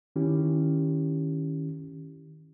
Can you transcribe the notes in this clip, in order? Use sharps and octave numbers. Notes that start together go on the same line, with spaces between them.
D#3 C#4 E4 G4